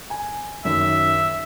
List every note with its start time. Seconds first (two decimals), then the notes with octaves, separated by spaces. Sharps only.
0.10 G#5
0.65 F#2 D#3 E5